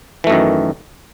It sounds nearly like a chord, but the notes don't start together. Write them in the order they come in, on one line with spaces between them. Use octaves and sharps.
E3 A3 F#2 D#3